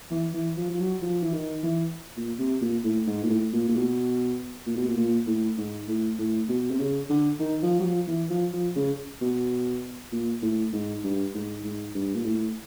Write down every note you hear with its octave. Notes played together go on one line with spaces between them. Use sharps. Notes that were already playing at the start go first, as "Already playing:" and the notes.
E3
E3
F3
F3
F#3
F3
E3
D#3
E3
A#2
C3
A#2
A2
G#2
A#2
A2
A#2
A#2
B2
A#2
B2
A#2
A#2
A2
G#2
A2
A2
B2
C3
C#3
D3
D#3
F3
F#3
F3
E3
F3
F3
C#3
B2
A#2
A2
G#2
G2
G#2
G#2
G2
A#2
A2